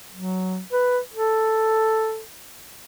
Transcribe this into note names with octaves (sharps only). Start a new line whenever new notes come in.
F#3
B4
A4